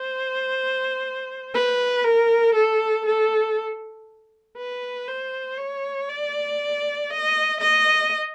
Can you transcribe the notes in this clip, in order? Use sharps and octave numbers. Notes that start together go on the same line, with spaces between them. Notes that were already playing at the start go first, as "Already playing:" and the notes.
Already playing: C5
B4
A#4
A4
A4
B4
C5
C#5
D5
D#5
D#5